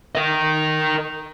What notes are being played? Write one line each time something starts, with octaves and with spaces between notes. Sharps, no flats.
A#4 D#5